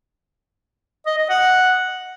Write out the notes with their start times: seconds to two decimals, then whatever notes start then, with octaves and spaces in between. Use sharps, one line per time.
1.06 D#5
1.18 D#5
1.29 F#5